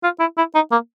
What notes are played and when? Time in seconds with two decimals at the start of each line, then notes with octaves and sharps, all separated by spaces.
0.04 F4
0.20 E4
0.38 E4
0.55 D#4
0.72 A#3